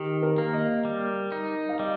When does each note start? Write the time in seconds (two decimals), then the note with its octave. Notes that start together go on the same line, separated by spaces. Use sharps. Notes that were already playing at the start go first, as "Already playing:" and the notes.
Already playing: D#3 G4
0.23 A#4
0.38 A#3
0.53 D#5
0.85 G3
1.32 D#4
1.69 F5
1.79 G3 D#5